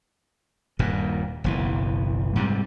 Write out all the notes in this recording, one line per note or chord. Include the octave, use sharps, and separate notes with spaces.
D#1 G2 A#2
F#1 B1 E3
G#2 C3 G3